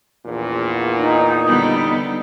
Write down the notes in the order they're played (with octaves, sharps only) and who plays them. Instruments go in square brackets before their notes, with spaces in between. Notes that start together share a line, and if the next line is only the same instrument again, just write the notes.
[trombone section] A#1 E2 A#2
[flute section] D#4
[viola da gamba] D3 G3 B3